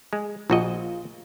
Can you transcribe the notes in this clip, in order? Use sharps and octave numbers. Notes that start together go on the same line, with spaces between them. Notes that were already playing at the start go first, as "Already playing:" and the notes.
G#3
A#1 F4 F#4 D#5